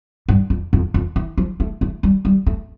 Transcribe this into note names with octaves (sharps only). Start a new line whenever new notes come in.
G2
F2
F2
F2
E3
F3
A3
A3
G3
G3
A3